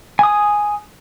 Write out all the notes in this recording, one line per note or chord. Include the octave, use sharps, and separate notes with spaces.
G#5 D#6